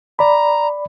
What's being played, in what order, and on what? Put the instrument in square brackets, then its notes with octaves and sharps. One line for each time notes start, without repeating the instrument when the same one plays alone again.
[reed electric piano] D5 B5 [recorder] A#5